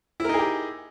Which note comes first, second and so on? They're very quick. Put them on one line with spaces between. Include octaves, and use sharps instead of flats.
E4 A#4 D#4 G#4 G4